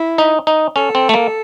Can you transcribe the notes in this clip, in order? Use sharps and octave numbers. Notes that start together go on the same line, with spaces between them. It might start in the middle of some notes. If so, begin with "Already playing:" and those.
Already playing: E4
D#4
D#4
C#4 A4
C4
A3
A#3